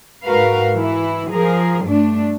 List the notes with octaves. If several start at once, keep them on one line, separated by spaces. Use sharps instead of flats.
G#2 F#4 A#4 B4 F5
E3 E4
F3 G#4 A#4
G2 A3 D4